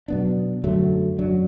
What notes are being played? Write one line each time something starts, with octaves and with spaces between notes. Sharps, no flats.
B2 F#3 B3 D4
F#2 D3 F#3 A3
F#2 F#3 D4